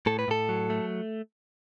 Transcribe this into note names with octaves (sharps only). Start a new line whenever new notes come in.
A2 A4
B4
A2 A4
F#3
A3